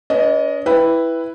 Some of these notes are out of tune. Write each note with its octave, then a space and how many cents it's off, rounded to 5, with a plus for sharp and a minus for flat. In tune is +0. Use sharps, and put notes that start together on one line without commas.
C#4 +45 B4 +0 D#5 +0
E4 +0 B4 +0 G5 +5